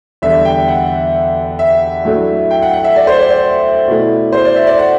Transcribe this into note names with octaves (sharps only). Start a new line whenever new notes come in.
E2 D3 G3 E5
G5
F#5
E5
A2 F#3 A3 D4
G5
F#5
F#5
E5
D5
C5
D5
D5
B2 A3 E4
C5
D5
E5
D5
F#5